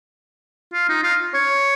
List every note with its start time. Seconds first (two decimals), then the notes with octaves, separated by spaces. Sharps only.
0.73 F4
0.89 D#4
1.04 F4
1.34 C#5